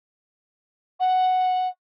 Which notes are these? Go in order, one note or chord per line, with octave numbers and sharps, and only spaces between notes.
F#5